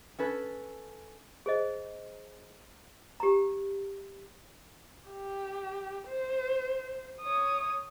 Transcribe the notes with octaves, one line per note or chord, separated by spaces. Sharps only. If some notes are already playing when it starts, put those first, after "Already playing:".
C#4 A4 B4
G#4 C5 D#5
G4 A#5
G4
C5
C#5 D#6